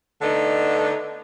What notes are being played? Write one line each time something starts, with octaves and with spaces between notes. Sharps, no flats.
D3 A3 B3 D4 D#4